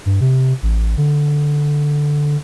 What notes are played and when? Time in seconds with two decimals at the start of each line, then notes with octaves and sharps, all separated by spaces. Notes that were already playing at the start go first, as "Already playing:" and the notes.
0.06 G2
0.21 C3
0.63 A1
0.97 D3